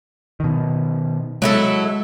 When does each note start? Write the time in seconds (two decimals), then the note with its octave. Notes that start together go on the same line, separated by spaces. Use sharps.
0.40 B2 D#3
1.42 F#3 G#3 E4 A4